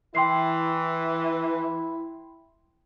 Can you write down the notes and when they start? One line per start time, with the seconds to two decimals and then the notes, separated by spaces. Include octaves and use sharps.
0.15 E3 E4 G5 C6 C7